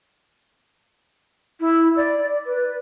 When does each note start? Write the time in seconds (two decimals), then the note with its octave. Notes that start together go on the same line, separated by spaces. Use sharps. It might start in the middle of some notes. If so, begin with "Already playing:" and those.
1.60 E4
1.96 D5
2.46 B4